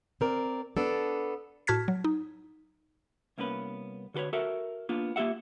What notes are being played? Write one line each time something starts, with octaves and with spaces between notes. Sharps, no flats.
C4 A#4 D5
B3 D4 A4
A2 F#4 A5 F6 G#6 B6
F#3
D#4
C2 A#3 B3 C#4 B4
D3 F#4 A4 B4 C#5
F#4 A4 A#4 E5
A#3 B3 D4 F4
A#3 F4 G4 E5 F#5